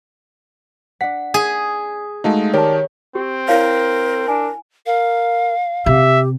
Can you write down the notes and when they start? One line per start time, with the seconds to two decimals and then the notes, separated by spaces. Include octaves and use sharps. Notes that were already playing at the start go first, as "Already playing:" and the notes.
1.01 D4 F#5 B6
1.34 G#4
2.24 G#3 A3 D#4 F#4 F5 A5
2.54 D#3 G4 A#4 C#5 D5 A5
3.15 C4 G4
3.48 E4 A#4 C#5 F5
4.28 D4 G#5
4.86 A#4 F5
5.86 C3 G4 E5